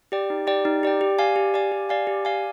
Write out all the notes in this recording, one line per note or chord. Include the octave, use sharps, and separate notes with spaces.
G4 D5 G5
D#4
G4 D5 G5
D#4
G4 D5 G5
G4
D5 F5 G#5
G4
D5 F5 G#5
G4
D5 F5 G#5
G4
D5 F5 G#5